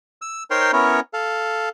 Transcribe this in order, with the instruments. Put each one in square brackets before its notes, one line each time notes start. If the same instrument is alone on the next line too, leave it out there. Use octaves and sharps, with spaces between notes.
[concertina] E6
D#4 A#4 C5 C#5 G5 C6
B3 C#4 E4 A#4 C#5
A4 F5